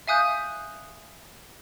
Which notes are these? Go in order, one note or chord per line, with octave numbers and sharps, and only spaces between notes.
E5 F5 G#5 D#6 F#6 G6